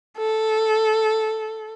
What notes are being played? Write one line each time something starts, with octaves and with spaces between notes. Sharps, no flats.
A4